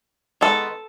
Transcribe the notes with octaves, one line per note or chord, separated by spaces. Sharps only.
D#3 G#3 B3 A4